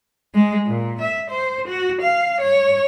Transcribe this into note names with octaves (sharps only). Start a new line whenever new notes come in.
G#3
A#2
E5
C5
F#4
F5
C#5